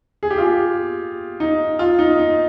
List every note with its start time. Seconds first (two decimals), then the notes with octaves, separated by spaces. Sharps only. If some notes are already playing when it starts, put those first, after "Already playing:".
0.23 G#4
0.30 G4
0.38 F4
0.47 G4
1.40 D#4
1.79 F4
1.99 D#4
2.19 D#4